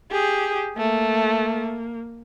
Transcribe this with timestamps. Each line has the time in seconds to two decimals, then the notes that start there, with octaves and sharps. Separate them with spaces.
0.11 G4 G#4
0.77 A3 A#3